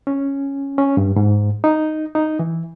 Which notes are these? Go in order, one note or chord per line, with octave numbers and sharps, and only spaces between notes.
C#4
C#4
G2
G#2
D#4
D#4
E3